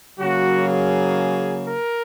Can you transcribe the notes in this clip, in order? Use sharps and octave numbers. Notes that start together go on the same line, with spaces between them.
C#3 F#3 A#3 F#4
G#4
A#4